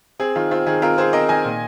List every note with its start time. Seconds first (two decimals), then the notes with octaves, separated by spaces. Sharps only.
0.20 C4 G#4
0.36 D#3 F4
0.51 C4 F4
0.66 D#3 G#4
0.82 C4 F4 A#4
0.98 C4 G#4 C5
1.13 C4 A#4 D#5
1.29 D#3 D#5 G#5
1.45 A#2